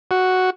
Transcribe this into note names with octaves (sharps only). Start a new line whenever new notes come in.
F#4